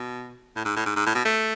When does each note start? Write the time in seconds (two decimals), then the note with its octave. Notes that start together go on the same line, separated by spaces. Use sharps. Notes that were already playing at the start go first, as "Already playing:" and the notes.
Already playing: B2
0.56 A2
0.65 G#2
0.76 A2
0.86 G#2
0.96 G#2
1.06 A2
1.15 B2
1.25 A3